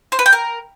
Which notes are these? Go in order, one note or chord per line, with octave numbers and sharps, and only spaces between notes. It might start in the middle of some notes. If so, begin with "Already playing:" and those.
C5
B4
G5
A#4